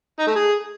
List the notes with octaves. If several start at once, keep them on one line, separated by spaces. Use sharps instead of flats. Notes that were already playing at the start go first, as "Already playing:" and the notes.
D#4
A3
G#4